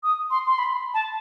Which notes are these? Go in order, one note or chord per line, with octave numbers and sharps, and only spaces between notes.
D#6
C6
C6
B5
A5